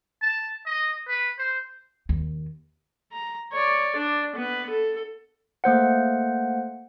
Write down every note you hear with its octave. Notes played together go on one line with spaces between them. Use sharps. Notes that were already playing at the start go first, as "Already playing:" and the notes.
A5
D#5
B4
C5
D#2
A#5
C#5 D5
D4
B3 B4
A4
A3 A#3 C5 F#5